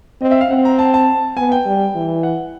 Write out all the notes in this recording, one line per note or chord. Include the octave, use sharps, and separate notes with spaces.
C4 D#5
E5
F5
C4 F#5
A#5
A5
A5
B3 G#5
G5
G3
E3
F#5